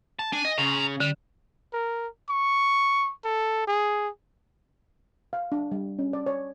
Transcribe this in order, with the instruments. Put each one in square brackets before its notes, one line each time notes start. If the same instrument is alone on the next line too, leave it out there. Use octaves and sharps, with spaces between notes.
[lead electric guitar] A5
[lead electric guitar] D4 [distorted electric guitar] G#5
[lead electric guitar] D#5
[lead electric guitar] C#3 [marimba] C#4 [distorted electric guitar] A#5 C6
[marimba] D3 [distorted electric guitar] G3
[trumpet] A#4
C#6
A4
G#4
[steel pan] F5
D4
G3
C#4
D5
C#5